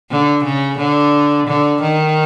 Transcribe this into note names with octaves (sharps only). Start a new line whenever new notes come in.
D3
C#3
D3
D3
D#3